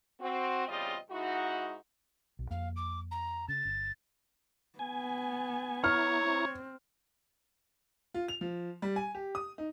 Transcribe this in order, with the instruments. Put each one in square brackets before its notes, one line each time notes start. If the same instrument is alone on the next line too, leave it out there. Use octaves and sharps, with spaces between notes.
[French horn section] C4 F#4
E2 C#3 G3 C4 F4 D#5
G#2 D#4 E4 F#4
[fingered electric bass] B1
[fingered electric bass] F2 A#3 [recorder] F5
[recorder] D6
A#5
[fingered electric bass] C#3 [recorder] A6
[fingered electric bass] G1
[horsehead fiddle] B3 [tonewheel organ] G#5
[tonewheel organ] E4 A#5 C#6 [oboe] C#5 [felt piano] F6
[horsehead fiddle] C4
[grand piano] F4
F7
F3
G3
G#5
G4
D#6
D#4